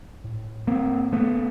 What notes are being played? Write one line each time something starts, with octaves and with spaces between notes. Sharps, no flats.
A2
A#3 C4
A3 B3